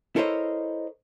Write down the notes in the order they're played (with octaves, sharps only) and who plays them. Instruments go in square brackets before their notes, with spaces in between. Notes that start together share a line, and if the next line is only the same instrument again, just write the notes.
[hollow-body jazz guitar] E4 A4 A#4 C5 C#5 D#5